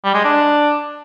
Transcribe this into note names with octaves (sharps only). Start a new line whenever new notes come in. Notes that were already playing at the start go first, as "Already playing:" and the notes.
G3
G#3
D4